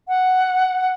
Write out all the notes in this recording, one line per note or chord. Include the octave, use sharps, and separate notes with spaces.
F#5